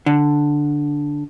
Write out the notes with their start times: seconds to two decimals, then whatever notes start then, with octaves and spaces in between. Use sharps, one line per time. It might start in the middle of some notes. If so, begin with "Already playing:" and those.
0.06 D3